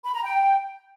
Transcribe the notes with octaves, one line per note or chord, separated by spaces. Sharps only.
B5
A#5
G5